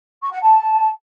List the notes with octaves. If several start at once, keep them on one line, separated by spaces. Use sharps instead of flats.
C#6
F#5
A5